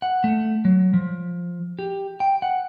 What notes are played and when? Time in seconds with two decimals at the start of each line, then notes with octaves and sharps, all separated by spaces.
0.02 F#5
0.24 A3
0.65 F#3
0.94 F3
1.79 G4
2.20 G5
2.42 F#5